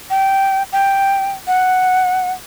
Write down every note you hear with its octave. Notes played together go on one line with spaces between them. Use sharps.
G5
G5
F#5